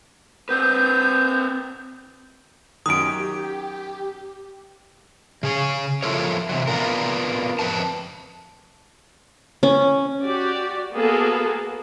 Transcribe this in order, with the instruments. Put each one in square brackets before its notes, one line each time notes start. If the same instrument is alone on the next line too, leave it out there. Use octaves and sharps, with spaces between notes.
[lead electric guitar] C4 B4 [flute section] G6
[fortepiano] F#2 D#3 [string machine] G4 [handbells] D#6 D7
[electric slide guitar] C#3 G#4 C#5
F3 E4 F4 A4 A#4 C#5
C3 E3 F#3
B3 D4 F4 A#4
F2 B4 G5 A5
[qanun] C#4
[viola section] F#4 G4 D5
A#3 B3 F#4 G#4 A4